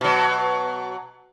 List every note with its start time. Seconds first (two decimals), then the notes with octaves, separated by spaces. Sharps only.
0.01 B2 F#3